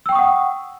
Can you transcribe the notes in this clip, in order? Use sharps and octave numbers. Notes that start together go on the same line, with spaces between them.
F#5 G5 C#6 D#6 E6